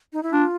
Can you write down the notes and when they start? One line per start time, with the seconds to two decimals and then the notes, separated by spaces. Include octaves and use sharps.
0.13 D#4
0.23 E4
0.32 D4 F4